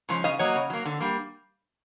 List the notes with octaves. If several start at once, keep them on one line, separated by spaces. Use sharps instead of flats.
C#3 F3 G#3 C#4
C#3 D#5 F5
F#3 A#3 C#5 D#5
C#3
F#3 A#3
D3
G3 A#3